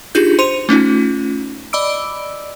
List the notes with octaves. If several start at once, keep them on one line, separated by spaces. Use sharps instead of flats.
D4 D#4 F4 G4 G#4 G6
C5 C6 C#7 D#7 F7
A3 C#4 D#4 F4
D5 D#5 B5 D6 E6 D7